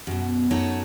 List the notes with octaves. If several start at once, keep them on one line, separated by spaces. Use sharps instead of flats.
F#2 B2
F#2 A3 D#4 C#5 F#5 A5